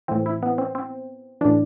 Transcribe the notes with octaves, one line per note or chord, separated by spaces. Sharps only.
A2 E3 C4
E4
B3
C4
C4
A2 E3 D4